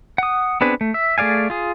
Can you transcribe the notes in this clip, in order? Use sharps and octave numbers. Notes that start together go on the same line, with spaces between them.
F#5 D#6
B3 C4 D4 G#4 B4
A3
E5
A3 G#4 D5 F5 G#5
F4 G#4